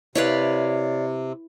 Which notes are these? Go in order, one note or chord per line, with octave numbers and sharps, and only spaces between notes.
C3 E4 B4 C#5 D5 F5